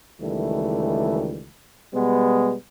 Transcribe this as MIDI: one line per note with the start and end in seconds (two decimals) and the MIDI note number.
0.21 1.50 37
0.21 1.50 51
0.21 1.50 52
0.21 1.50 55
0.21 1.50 57
1.94 2.55 47
1.94 2.55 55
1.94 2.55 56
1.94 2.55 59